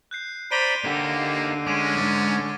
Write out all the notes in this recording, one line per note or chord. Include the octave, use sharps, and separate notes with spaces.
F#6 G6 C7
C5 D5 A#5 B5 D7 D#7 G7
D3 A#3 D#4 G4 C7
G#3 C#4 D6 D7 D#7
E2 G#2 D6 A6